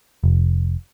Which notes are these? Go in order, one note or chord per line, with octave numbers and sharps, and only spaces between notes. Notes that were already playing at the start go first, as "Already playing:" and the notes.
F1